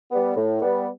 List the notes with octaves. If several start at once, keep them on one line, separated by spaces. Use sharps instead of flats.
G3 B3
A2
G3 B3